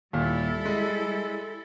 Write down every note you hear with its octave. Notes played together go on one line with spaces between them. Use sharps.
D#2 A#2 G3 E4 A4
G#3